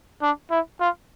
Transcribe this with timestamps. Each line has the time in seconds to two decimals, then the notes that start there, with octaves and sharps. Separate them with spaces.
0.22 D4
0.51 E4
0.80 F4